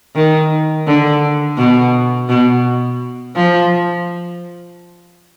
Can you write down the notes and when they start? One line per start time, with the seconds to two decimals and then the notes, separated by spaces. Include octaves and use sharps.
0.15 D#3
0.87 D3
1.57 B2
2.29 B2
3.35 F3